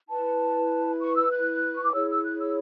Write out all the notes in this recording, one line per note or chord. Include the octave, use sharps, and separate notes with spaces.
E4 B4 A5
C#6
E6
F#6
C#6
D6
E4 G#4 C#5 E6
E6
F#6
E6